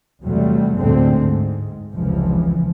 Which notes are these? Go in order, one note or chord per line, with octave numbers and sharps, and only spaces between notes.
E2 C3 F#3 G3 A3
D2 A2 D3 G#3 A3 C4
G#2
F1 C#2 E3 F3